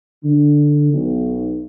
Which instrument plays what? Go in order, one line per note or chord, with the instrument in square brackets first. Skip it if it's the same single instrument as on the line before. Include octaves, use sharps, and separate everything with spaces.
[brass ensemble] D3
B1